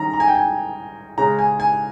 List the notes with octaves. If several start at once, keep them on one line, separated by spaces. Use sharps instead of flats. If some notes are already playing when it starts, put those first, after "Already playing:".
Already playing: D#3 G3 C#4 A#5
A#5
G#5
G5
G#5
C#3 G#3 C#4 A#5
G#5
G#5